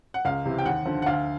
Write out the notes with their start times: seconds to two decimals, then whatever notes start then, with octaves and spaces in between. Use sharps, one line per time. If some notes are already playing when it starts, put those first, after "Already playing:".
0.14 F#5
0.25 C#2 F5
0.45 C3 E3
0.58 G5
0.65 D#2 F#5
0.86 D3 F3
1.02 F#5
1.06 D2 F5